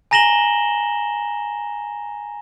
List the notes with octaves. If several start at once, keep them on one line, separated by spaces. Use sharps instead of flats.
G#5 A#5 A#6 E7 F#7 G7